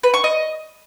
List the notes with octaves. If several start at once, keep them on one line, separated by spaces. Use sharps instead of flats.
B4
C#6
D#5